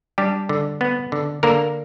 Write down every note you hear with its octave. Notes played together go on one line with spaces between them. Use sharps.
G3 D4 G4
D3
B3
D3
D3 A#3 A#4